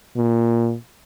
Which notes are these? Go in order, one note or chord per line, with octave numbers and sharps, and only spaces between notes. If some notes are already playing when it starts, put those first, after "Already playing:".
A#2